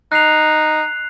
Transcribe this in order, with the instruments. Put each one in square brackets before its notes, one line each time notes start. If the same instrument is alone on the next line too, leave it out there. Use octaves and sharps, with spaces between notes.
[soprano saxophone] D#4 [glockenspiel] F#6 C7 F7